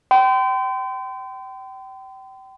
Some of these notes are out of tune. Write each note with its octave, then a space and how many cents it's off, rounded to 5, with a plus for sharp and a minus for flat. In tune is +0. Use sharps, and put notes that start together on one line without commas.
G5 -30 C6 -40